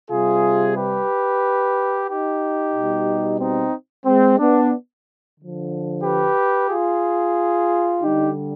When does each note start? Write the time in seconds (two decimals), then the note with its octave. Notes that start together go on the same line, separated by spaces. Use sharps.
0.11 C3 G3 F4 G#4
0.77 G4 B4
2.08 D#4 G4
2.75 B2 G3
3.40 C4 D#4
4.06 G#3 C4
4.39 B3 D4
5.38 D3 F3
6.04 G4 B4
6.69 F4 G#4
8.02 D3 G3 D#4 G4